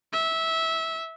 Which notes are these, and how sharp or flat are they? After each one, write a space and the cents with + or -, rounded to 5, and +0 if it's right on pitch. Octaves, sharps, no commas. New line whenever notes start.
E5 -15